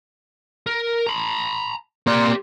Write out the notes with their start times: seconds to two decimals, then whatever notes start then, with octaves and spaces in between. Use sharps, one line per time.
0.67 A#4
1.06 A#5 B5
2.07 A#3 G4 D5 C6